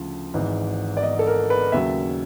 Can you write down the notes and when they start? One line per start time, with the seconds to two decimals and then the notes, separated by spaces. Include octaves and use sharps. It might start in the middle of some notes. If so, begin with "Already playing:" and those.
Already playing: D2 C#3 F3
0.34 G#1 G#2 E3
0.97 D5
1.03 D#5
1.19 A4
1.27 A#4
1.50 B4
1.72 D#2 C#3 F#3 E5